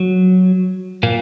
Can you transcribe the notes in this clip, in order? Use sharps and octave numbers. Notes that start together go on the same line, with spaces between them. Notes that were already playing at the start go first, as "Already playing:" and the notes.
Already playing: F#3
A#2 A#3